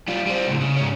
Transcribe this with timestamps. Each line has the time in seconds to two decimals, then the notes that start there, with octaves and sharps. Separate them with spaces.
0.08 G3 F4
0.26 G3 C5
0.47 C#2 A2
0.61 C#3
0.77 G#2 C#4